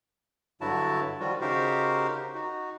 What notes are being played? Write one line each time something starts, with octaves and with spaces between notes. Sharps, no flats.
G2 D3 F#3 E4 F#4 A5
D#3 F3 G3 F4 F#4
C#3 D#4 F#4 G4 A#4 C5
D#4 F#4